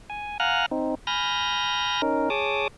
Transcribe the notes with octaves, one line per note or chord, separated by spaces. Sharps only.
G#5
F5 F#5 G#5 A#5 F6 F#6
C4 D#4
G#5 B5 F6 G6 A#6
C#4 D#4 A#4
G#4 C#5 A5 D6 D#6